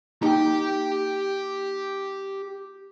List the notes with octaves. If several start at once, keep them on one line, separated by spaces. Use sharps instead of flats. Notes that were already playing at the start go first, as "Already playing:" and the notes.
A#3 D#4 G4 G5 A#5